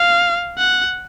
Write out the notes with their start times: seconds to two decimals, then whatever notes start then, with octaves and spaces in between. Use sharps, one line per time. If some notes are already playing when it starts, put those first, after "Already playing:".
Already playing: F5
0.58 F#5